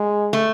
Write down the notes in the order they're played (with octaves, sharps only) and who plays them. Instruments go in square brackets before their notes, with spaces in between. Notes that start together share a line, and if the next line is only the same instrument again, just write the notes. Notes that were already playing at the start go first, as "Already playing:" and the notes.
Already playing: [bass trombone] G#3
[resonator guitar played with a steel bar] A3